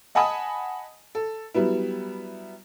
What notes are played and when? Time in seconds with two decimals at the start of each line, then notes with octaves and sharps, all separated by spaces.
0.15 D#5 F#5 G#5 A5 B5 D#6
1.15 A4
1.54 F#3 G3 B3 E4